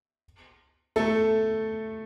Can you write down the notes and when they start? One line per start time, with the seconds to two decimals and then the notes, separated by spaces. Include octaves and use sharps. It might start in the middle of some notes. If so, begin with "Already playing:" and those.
0.96 A3 A4